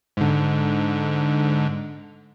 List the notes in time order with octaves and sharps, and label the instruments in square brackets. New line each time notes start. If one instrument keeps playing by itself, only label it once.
[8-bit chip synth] G#2 D3